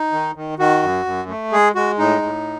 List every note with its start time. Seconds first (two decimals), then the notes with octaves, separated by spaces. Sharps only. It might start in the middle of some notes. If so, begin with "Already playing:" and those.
Already playing: D#4
0.12 D#3
0.35 D#3
0.59 D#3 F#4
0.82 F#2
1.05 F#2
1.29 A3
1.52 G#3 G#4
1.75 G#3 F#4
1.99 A2 D#4
2.22 A2